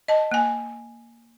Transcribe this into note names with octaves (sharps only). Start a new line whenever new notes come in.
D#5 A5
A#3 G#5